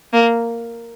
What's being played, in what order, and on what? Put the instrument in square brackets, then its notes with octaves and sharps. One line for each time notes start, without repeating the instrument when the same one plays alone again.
[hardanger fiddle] A#3